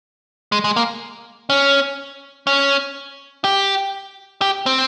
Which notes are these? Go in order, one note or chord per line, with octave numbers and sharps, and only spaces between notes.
G#3
G#3
A#3
C#4
C#4
G4
G4
C4